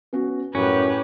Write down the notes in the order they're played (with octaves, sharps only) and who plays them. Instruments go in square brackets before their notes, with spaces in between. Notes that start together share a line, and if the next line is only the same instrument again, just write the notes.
[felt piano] B3 C#4 F#4
[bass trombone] F#2 [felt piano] A2 [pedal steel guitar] C#4 [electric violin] G4 B4